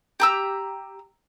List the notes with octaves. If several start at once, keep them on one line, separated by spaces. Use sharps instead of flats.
G4 A#5 E6